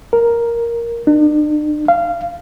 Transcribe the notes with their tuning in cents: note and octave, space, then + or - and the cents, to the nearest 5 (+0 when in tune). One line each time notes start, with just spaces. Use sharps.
A#4 +5
D4 +45
F5 -20